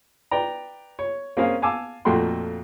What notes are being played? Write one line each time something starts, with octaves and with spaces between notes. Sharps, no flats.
B4 D5 G5 A#5
C#5
A#3 C4 C#4 G#4 F5
F5 G#5 A5 D6 E6
F2 A#2 A3 F#4 G5 C6